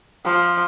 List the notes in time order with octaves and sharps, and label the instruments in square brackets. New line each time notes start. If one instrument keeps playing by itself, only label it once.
[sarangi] F3